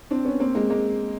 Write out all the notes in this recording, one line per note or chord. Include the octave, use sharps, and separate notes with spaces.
C4 D4
B3 C#4
A#3 C4
G#3 A#3
G#3 A#3